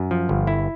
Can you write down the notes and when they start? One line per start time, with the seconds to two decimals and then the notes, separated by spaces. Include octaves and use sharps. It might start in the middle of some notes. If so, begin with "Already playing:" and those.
Already playing: F#2
0.11 F3
0.29 G1
0.47 E4